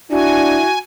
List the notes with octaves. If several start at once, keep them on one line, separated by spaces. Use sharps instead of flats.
D4 E4 F#4 G#5